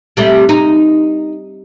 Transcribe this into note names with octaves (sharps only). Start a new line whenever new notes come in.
C3 G3 A3
D#4